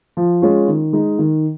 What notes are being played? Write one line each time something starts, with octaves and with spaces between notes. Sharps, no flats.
F3
G#3 C#4 F4
D#3
G#3 D#4
D#3